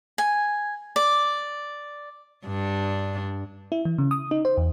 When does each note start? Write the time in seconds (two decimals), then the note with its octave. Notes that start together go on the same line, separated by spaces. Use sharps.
0.18 G#5
0.96 D5
2.46 G2 D4
3.72 E4
3.85 E3
3.98 C#3
4.11 D#6
4.31 D#4
4.45 C5
4.57 E2